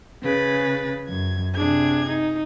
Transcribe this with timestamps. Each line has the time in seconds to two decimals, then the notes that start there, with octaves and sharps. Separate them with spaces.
0.22 C#3 G#4 B4 A6
1.07 F#2 G#6
1.54 C3 D4 G#4 G#6
2.08 D#4